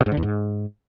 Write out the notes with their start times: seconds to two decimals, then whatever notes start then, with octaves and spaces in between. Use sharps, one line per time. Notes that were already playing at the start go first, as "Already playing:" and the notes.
0.01 B2
0.06 G#2
0.12 D3
0.17 E2
0.23 G#2